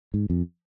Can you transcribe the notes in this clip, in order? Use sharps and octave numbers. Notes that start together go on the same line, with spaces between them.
G#2
F2